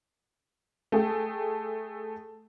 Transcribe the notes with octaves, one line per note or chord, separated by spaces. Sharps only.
A3 G#4 A4 G5